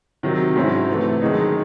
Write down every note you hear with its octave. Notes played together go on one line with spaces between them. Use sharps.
C3 D#3 F#3
G#2 F#3 C#4 E4
C3 E3 A3
F#2 D#3 G#3 D#4